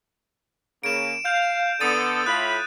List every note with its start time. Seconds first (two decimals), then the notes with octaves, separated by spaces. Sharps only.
0.83 C#3 A#3 D7 E7
1.25 F5 G6
1.80 D3 B3 A4 D#6 A6 D#7
2.26 A2 F4 B5 F#6